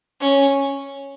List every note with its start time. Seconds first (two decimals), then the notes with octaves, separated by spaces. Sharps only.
0.20 C#4